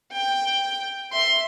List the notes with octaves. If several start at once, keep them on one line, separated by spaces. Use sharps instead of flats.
G5
E5 C6